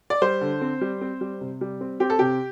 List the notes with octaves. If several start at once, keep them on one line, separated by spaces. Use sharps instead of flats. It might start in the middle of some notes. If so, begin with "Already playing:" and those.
D5
G3 C5
D3
C4
G3
C4
G3
C3
G3
C4
C4 G4
A4
C3 G4